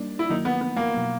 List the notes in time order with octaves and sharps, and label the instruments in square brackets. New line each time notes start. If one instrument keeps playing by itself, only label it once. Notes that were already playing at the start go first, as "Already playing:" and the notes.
Already playing: [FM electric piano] G3 A#3 D#4 [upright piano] D4
[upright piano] E4
[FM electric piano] D#3 F#3 A#3 [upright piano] D#4
[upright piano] B3
B3
A#3
[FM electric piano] B2 F#3 B3